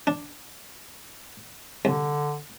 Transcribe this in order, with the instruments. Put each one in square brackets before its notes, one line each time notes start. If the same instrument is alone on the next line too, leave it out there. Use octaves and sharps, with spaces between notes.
[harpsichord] D4
[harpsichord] C2 [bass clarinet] D3